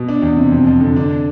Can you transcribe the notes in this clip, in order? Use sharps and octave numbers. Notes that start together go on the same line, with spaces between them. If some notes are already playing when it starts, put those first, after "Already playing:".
Already playing: B2
D4
E2
C3
F2
F2
D3
D4